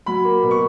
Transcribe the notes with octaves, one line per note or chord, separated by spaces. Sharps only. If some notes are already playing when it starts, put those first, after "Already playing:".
F#3 B5
A#3
B2
C#6